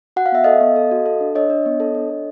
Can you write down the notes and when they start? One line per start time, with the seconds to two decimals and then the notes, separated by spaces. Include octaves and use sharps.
0.16 F#4 F#5
0.26 F5
0.32 B3 E5
0.44 A4 D#5 F5
0.61 B3
0.76 A4
0.91 F#4
1.06 A4
1.21 D4
1.35 D4 C#5 D#5
1.50 D4
1.66 B3
1.80 A4
1.95 D4
2.10 A4